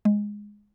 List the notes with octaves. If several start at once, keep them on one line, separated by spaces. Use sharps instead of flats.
G#3